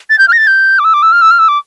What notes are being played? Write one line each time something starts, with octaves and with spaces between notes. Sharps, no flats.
A6
G6
F6
A#6
A6
G6
D6
E6
D6
E6
F6
E6
F6
E6
D6